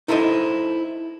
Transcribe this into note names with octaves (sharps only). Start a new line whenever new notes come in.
D#4 E4 A4 C5 C#5 D#5